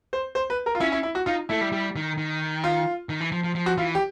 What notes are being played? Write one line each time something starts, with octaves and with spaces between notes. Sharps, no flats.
C5
C5
B4
A#4
F4
C#4 E4
E4
E4
F#4
D#4 F4
A3 E4
G3
G3
D#3
D#3
F4
D#3
E3
F3
F3
F3
F#4
E3 F4
G4